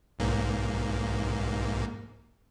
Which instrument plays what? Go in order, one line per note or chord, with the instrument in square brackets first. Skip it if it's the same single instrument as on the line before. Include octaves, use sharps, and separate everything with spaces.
[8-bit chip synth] B1 G#2 A#3